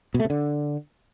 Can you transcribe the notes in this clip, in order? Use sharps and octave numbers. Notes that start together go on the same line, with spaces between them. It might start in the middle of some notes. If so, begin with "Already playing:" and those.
B2
A3
C3
D3